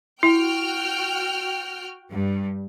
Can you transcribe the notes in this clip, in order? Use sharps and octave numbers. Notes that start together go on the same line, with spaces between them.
E4 F#4 G5 F6
G2